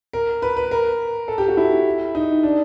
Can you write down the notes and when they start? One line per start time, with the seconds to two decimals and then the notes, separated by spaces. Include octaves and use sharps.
0.13 A#4
0.42 B4
0.57 B4
0.71 A#4
1.28 A4
1.38 G4
1.48 F#4
1.57 E4
2.15 D#4
2.43 D4